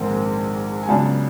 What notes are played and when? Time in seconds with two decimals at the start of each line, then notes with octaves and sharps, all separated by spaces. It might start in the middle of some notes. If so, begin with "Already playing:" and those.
Already playing: A#1 G#2 D#3 G#3 C4
0.83 G#5
0.88 C#2 C#3 F#3 B3 D4 A5